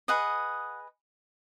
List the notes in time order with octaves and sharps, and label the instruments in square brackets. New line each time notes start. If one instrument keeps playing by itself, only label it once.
[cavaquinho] G#4 B4 D#5 F#5